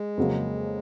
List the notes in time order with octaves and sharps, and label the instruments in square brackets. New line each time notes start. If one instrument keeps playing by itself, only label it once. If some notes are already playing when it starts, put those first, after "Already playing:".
Already playing: [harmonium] G#3
[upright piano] F2 C#3 F#3 A#3